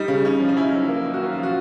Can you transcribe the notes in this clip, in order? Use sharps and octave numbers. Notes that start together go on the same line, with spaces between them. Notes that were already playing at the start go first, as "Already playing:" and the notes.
Already playing: G3 D#4
C#3
C#4
F3
D#4
C#4 E4
F#3
A#3
D#3
F#4
C#4 F4
F4
F3
F#4